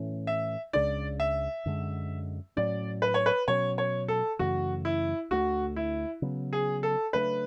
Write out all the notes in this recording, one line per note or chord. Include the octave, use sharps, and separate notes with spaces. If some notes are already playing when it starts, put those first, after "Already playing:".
Already playing: A2 E3 A3 C#4
E5
C#2 C#3 G#3 D4 D5
E5
F#2 D3 G#3
A2 F#3 C#4 D5
B4
C#5
B4
B2 F#3 C#4 C#5
C#5
A4
F#2 C#3 E3 A3 F#4
E4
D2 D3 A3 F#4
E4
C#3 F#3 B3
G#4
A4
C#3 F#3 A3 D4 B4